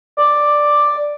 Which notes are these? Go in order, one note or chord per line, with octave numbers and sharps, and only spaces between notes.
D5